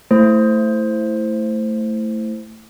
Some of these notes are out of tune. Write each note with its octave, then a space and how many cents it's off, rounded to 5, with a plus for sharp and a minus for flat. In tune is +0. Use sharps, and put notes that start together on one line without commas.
A3 +10 E4 +0 C5 +0